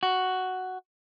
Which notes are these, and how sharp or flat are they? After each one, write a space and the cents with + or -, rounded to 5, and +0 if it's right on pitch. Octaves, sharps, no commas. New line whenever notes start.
F#4 +5